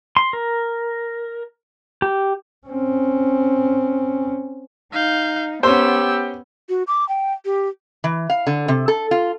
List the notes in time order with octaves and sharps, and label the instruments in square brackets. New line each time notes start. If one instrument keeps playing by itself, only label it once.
[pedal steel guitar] C6
A#4
G4
[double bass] C4 C#4
[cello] D#4 [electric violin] F5 G6
[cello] B3 [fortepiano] C#4 C5 [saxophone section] G4 [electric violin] E6
[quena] F#4
D6
G5
G4
[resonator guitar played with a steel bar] E3
F5
D3
C3
A4
F4